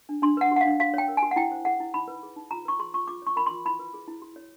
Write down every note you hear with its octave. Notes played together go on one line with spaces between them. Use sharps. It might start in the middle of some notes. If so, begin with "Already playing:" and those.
D4
D4 C6
B4 F#5
F#4 F#5
D4 F5
F#4 F5
C#5 G5
A#4
G#5
F#4
F#5
E4 G5
C5
G#4 F#5
E4
D#4 B5
B4
G#4
D#4
F4 A#5
B4 C#6
G#4 C6
F4 C#6
F4 D6
C#5 C#6
A#4 B5
F4 C6
E4 B5
B4
G#4
E4
F#4
C#5